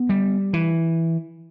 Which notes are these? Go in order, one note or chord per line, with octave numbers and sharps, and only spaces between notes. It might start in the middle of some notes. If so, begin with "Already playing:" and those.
Already playing: B3
G3
E3